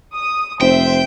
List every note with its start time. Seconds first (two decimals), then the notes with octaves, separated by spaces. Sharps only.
0.14 D#6
0.60 F1 C5 E5 G5